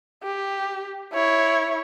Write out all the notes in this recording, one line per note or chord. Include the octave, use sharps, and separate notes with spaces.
G4
E4 C#5